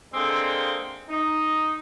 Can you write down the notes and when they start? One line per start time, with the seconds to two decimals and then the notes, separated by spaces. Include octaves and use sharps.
0.14 D3 G#3 A#3 C4
1.09 D#4